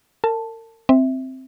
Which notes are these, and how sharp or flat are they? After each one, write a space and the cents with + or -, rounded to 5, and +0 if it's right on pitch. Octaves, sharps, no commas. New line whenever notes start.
A#4 -40 A5 +0
C4 +0 E5 -10